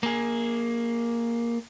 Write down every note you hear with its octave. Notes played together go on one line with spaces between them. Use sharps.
A#3 G#4